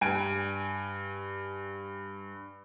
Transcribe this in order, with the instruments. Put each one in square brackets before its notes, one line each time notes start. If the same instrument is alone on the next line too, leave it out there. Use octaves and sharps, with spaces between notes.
[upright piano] G2 G#5 D7